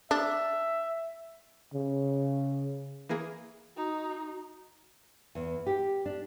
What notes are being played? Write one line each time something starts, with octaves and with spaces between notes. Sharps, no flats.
D4 E5
C#3
E3 A#3 G#4
D#4 F#4
E2
G4
D4